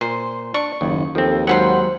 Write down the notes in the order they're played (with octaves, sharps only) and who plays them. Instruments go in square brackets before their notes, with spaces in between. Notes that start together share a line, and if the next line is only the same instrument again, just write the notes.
[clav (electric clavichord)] A#2 [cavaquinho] C5
[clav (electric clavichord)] D4 [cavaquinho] C#6
[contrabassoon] F#1 [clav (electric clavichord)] D#2
[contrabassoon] D#2 [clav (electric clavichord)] F3 C4 [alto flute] A4
[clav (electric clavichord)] G#2 F#3 [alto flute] C5 [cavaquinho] F#5 B5 C6